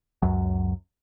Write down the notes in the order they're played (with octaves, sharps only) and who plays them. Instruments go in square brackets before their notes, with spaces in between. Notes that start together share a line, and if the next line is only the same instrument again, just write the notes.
[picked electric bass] C#2 F#2 F#3